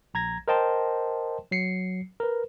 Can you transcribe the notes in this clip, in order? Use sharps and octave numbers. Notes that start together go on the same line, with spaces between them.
A#1 A#5 G#6 A#6
A#4 C5 D#5 G5 A5 C6
F#3 C7 C#7
A#4 B4